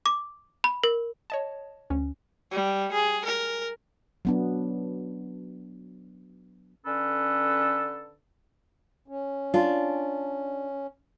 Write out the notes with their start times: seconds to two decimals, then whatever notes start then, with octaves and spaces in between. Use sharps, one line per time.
0.06 D6
0.64 B5
0.84 A#4
1.30 C#5 D#5 A5
1.90 D2 C#4
2.51 G3
2.92 G#4
3.25 A#4
4.25 F#3 B3 D4
6.86 D3 C#4 A4 B4
9.08 C#4
9.54 D4 F4